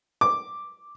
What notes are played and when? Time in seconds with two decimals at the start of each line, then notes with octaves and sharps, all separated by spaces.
0.21 D6